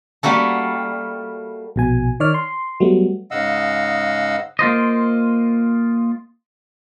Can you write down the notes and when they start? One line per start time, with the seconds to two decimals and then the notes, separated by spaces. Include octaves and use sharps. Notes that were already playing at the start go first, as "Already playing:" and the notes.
0.23 G3 A3 A#3 F#4 A4
1.76 A#1 B2 G#5
2.20 D#3 C#5 D5 F6
2.34 C6
2.80 F#3 G3 A3 B3
3.31 G#2 C#3 D#5 F5 F#5 E6
4.59 A#3 F4 C5 D#5